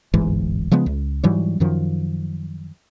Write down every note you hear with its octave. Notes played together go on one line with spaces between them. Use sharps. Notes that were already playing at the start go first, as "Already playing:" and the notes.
D1 G1 G#2 E3
C#3 F3 G#3 B3
C#2
G#2 E3 F#3 G3
F#2 D#3 F3